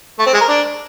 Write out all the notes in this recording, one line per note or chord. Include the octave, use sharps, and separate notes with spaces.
A3
C4
G#3
A#4
D4